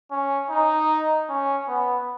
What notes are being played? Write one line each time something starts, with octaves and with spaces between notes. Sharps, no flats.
C#4
D#4
C#4
B3